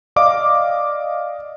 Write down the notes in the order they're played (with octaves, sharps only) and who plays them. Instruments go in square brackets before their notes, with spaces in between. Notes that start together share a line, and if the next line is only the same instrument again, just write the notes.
[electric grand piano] D5 D#5 F5 D6